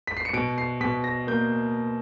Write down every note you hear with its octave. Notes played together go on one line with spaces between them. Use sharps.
B6
C7
C#7
B2 D7
C7
B2 B6
A#6
A#3 G6